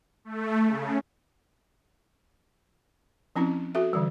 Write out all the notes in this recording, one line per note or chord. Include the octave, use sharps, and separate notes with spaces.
A3
C#3
F3 C4 C#4 E4
F#4 A4 E5
D3 E3 G3